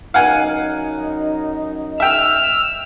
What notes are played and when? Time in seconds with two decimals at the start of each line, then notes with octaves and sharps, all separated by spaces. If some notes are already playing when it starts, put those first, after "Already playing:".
0.14 F#2 D#4 F5 F#5 G#5
2.00 E5 G5 E6 F6